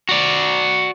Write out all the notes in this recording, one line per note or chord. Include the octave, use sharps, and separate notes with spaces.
F#4 D5